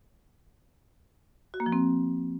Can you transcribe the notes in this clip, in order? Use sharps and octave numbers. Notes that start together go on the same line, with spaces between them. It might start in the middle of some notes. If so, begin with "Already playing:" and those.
F#4
A#3
F3
C4